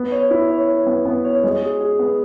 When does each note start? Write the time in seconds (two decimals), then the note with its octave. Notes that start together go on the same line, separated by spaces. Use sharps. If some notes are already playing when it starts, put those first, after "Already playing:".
Already playing: B3
0.12 C#5
0.31 E4
0.49 C#5
0.68 C#5
0.87 B3
1.05 B3
1.25 C#5
1.44 G#3
1.62 G#4
1.81 G#4
1.99 B3